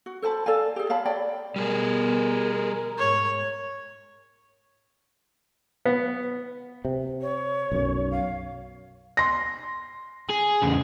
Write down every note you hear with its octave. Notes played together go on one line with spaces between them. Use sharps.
F#4
A4 C5 A5 B5
A4 D5 F5 G#5
G4 G#4
C#5 F5 A5 B5
C#5 D5 G5 B5
B2 G3 B3 G#4 A#4
G#2 C#5
B3
C3
C#5
B1 F#2
F5
C6 A#6
G#4
E2 C#3